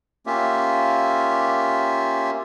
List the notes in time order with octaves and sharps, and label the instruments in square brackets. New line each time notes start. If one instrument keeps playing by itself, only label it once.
[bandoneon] A#3 C#4 F4 G4 E5